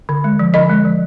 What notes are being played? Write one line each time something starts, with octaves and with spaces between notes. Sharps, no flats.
D3
G#3
F3
D3 D#5
G#3
F3